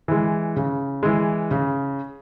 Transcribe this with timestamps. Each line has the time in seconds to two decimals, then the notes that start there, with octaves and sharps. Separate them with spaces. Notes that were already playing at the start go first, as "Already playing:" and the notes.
0.08 E3 G#3
0.56 C#3
1.03 E3 G#3
1.51 C#3